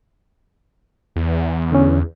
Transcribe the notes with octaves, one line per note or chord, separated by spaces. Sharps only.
E2
D3 C#4